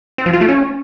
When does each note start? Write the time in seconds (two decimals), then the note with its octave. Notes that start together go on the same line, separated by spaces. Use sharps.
0.18 C4
0.26 F3
0.33 F4
0.41 A3
0.48 C#4